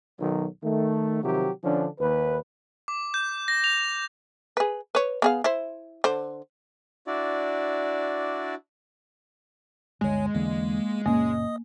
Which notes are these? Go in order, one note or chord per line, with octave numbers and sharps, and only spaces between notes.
B1 D#3 F#3
D#3 A3
C3 D#3 F3 F#3 G4
D3 F3 C#4 D4
D#2 B4
D6
G6
A#6
F7
G#4 B4
B4 C#5
B3 G#4 F5
E4 C5
D3 C5
D4 E4 F#4 D5
G1 D2 G#3 C#5 G#5
E2 D3 A#3
F#1 A#2 A#3 C#4 D#5 D#6